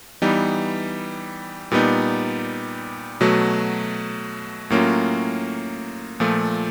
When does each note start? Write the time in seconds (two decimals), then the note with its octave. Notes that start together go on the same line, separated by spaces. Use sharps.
0.22 E3 G3 B3 D#4
1.71 A#2 G3 B3 D#4
3.21 B2 F#3 A3
4.70 A2 F#3 A#3 C#4 F4
6.20 A#2 F3 A3